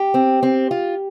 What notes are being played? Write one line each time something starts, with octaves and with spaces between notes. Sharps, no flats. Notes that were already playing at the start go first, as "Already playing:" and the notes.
Already playing: G4
C4
C4
F4